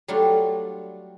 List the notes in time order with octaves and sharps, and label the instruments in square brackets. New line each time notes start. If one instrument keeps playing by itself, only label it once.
[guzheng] F#3 G3 A3 D4 F4